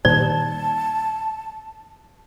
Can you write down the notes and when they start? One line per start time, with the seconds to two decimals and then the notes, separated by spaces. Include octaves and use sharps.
0.05 A#2 D#3 G3 D5 A5